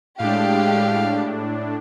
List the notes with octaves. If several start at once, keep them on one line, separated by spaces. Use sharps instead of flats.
A2 G#3 D4 G4 F5